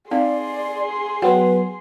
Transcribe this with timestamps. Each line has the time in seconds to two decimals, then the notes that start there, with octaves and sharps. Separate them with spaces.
0.11 C4 D#4 G#4 D5 F5 C6
1.22 F#3 B3 B4 F#5 G5